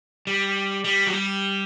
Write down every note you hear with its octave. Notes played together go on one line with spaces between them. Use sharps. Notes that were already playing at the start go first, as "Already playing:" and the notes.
G3
G3
F#3
G3